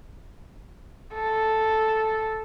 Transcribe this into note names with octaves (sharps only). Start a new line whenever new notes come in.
A4